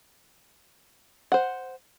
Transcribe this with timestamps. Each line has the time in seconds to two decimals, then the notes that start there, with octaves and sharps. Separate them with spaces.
1.32 C5 F#5